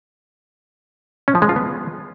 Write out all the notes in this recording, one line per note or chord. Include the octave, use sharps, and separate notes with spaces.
C#4
F3
G#3
F4
B3